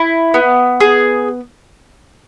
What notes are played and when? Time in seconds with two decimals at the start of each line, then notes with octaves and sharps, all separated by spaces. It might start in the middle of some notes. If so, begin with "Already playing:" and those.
Already playing: E4
0.34 B3
0.80 G#4